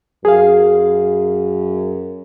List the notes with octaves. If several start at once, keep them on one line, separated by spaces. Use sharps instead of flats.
F#2 G#4 F5